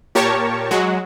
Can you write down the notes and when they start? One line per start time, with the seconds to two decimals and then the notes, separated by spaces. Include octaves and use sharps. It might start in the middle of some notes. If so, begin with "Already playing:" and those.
0.15 A#2 G4 A#4 C#5 A5 C#6
0.71 F#3 G#3 F#4